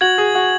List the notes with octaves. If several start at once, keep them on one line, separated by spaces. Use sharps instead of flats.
F#4 G#6 F#7
G#4
F#4